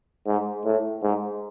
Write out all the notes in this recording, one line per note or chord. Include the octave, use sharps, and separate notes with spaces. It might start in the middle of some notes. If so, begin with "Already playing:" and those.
G#2
A2
G#2